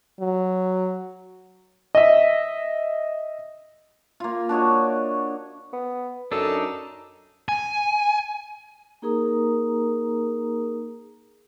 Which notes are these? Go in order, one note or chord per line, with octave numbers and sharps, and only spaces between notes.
F#3
D#5 E5
A#3 F4
D4 F#4 C#5 D#5
B3
F#2 D4 D#4 A4
G#5
A#3 D#4 G#4 A#4 A#5 D#6